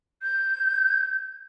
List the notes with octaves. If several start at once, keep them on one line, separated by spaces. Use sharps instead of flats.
G6